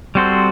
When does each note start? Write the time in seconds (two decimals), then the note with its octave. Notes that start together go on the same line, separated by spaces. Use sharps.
0.15 G3 C4 F#4 A4 C5